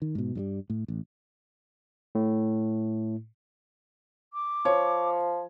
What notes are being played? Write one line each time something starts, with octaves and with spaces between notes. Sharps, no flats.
D#3
G#2 B2
G2 F#3 G3
A2
A1
A2
D6
F3 C#5